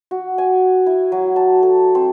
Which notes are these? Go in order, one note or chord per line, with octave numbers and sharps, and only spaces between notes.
F#4
G#5
E4
F#3
A5
A4
C4